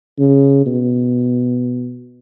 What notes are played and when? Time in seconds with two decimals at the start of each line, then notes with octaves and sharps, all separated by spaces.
0.19 C#3
0.66 B2